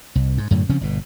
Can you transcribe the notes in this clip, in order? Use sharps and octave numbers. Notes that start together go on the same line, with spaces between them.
C2
G#2
F#2 A2 D3 F#3
C#3 F3 C4 C#4
G1 B2